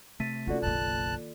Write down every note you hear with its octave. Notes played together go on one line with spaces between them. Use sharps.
C3 A3 A6 B6 D#7
C#4 D#4 F4 F#4 A4 D5
F#1 B1 D#3 A#3 A5 F#6